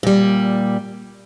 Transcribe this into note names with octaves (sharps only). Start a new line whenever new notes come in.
A#2 G3